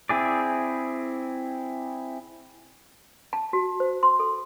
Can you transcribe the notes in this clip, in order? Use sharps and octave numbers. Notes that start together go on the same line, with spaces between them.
C4 E4 G#4 D5
A5
F#4
C5
C6
A4